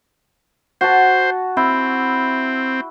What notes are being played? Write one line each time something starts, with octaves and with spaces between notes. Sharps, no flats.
F#4 C5 A5
C4 E4